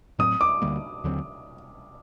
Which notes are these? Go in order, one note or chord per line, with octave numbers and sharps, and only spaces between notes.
A2 F#3 C4 D#6
D6
D2 D3 G3 A#3
D#2 D3 F#3 C4